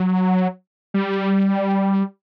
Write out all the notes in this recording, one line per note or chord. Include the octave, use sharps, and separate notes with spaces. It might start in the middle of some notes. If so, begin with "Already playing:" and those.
Already playing: F#3
G3